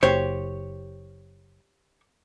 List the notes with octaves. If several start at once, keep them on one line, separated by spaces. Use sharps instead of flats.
F#1 G4 C5 C#5